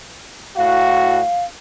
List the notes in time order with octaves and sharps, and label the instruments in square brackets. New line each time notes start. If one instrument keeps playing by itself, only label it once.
[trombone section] A2 F#4 [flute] F5